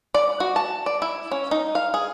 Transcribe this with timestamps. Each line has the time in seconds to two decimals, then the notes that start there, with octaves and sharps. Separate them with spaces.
0.14 D5
0.40 F#4
0.56 A5
0.86 D5
1.02 E4
1.31 C#4
1.51 D#4
1.75 F5
1.94 G#4